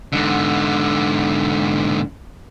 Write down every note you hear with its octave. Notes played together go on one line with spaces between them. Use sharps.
G#2 D3